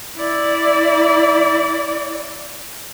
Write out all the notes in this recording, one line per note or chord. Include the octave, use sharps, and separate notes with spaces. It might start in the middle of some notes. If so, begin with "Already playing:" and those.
E4 D5